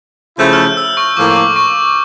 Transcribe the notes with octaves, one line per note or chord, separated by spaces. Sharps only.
C#3 F3 A3 E4 G6
F6
G6
E6
C#6
A2 F3 A#3 D6
D6
C#6